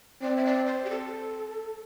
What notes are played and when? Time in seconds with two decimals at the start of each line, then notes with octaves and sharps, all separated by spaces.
0.23 C4 D5
0.37 E5
0.45 D5
0.66 C5
0.84 G4
0.90 A4